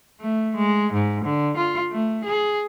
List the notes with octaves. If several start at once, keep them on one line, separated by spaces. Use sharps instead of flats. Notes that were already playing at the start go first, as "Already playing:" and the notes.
A3
G#3
G#2
D3
F4
A3
G#4